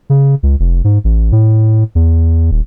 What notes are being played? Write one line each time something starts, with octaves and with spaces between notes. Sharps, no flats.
C#3
C#2
F1
G#2
A1
A2
E2
D#1